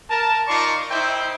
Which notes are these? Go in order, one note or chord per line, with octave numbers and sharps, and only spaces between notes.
A#4 A5
D#4 F4 A#4 D5 C6 C#6
D#4 E4 C5 E5 G5